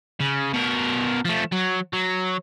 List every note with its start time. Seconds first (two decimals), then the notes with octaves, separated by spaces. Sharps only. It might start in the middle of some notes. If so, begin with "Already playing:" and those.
0.21 C#3
0.54 B2 A#4
1.25 F3 A3
1.52 F#3
1.93 F#3